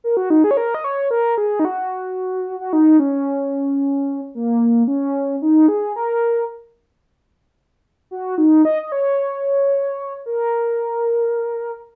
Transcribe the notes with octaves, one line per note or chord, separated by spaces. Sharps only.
A#4
F#4
D#4
G#4
C#5
A#4
D#5
C#5
A#4
G#4
D#4
F#4
F#4
D#4
C#4
A#3
C#4
D#4
G#4
A#4
F#4
D#4
D#5
D#5
C#5
A#4